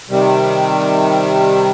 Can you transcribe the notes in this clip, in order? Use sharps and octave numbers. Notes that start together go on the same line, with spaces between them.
C3 D#3 G3